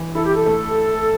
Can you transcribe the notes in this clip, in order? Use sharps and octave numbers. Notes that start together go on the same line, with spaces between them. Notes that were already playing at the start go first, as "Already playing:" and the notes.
Already playing: E3
E4 A4
G4
A4
A3